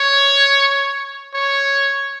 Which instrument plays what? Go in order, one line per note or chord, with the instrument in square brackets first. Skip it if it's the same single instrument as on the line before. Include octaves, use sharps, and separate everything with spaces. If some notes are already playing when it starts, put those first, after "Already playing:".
Already playing: [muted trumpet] C#5
C#5